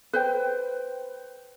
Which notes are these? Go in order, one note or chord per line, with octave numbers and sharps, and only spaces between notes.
B4 C5 G5